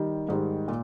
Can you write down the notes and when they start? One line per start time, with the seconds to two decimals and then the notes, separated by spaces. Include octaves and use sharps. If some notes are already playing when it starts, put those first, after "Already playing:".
Already playing: D#3 G3
0.29 G#2 D#3 G3
0.68 A#2